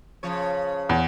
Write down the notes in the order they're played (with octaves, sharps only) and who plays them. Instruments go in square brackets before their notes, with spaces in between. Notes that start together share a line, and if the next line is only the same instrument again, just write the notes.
[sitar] C#3 F3 C#5
[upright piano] E2